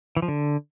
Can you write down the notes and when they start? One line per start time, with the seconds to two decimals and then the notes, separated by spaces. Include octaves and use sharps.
0.17 E3
0.22 F3
0.28 D3